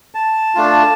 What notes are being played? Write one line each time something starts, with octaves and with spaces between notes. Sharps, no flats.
A5
A3 D4 F4